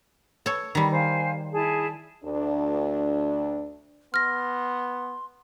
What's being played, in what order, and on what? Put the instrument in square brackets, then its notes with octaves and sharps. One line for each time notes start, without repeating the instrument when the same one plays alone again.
[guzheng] A4 C#5
D#3 G3
[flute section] C5 F5 G#5
E4 G#4 A5
[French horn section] D2 D4
[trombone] B3 [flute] C6 [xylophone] F6 A#6